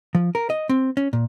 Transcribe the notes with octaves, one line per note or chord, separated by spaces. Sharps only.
F3
A#4
D#5
C4
C#4
A#2